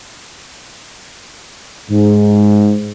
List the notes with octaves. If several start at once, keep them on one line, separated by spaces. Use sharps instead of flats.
G#2